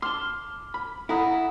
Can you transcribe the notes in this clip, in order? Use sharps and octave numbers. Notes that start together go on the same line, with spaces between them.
A5 C6 D6 F6 G7
B5
E4 A4 F#5 A#5 B5 D#6